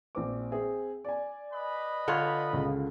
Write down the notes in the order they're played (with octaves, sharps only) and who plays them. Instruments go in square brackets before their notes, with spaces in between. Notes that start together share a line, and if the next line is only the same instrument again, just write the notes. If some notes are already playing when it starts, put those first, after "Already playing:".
[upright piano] A#1 C4 D6
C4 G#4 E5
D5 G#5
[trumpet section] B4 D#5 B5
[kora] D3 F4 C#5
[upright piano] C#2 C#3